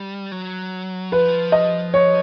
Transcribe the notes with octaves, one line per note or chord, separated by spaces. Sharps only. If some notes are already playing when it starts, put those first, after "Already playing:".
Already playing: G3
F#3
F3 B4
D#5
C#5